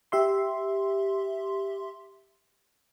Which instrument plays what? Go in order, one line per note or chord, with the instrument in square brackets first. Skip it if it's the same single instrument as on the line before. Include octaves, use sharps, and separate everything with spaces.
[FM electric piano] G4 E5 C6